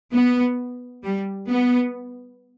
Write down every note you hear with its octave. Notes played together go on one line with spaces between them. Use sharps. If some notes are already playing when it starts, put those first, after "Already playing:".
B3
G3
B3